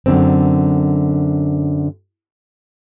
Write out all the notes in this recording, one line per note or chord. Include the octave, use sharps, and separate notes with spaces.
F#2 D3 C4